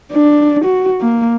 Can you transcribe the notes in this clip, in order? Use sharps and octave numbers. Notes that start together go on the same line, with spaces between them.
D4
F#4
A#3